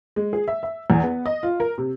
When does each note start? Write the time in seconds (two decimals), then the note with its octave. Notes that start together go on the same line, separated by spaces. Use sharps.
0.16 G#3
0.33 G#4
0.48 E5
0.63 E5
0.90 E2
1.03 B3
1.26 D#5
1.43 F4
1.60 A#4
1.78 C3